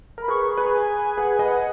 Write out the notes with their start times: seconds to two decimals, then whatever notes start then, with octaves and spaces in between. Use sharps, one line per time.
0.18 A#4 B5
0.28 G#4 B4 C#6
0.41 C#6
0.52 B5
0.58 G#4 B4 A#5
0.72 G#5
1.17 G#4 B4 F#5
1.30 G#5
1.39 B4 D#5
1.43 F#5